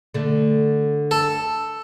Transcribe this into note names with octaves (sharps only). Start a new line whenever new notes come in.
D3 A3
A4